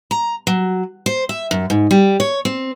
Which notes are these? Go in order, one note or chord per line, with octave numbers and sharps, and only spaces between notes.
A#5
F#3
C5
E5
F#2
G#2
G3
C#5
C4